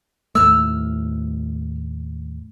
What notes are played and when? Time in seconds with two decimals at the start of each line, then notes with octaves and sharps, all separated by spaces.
0.35 D#2 A2 A3 E6 F6